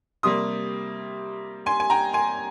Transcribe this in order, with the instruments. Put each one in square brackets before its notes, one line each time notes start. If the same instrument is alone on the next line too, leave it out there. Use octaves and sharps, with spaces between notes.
[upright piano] C3 G3 A#3 C6 D#6
G#5 C6
G#5
G5 A#5
G#5 C6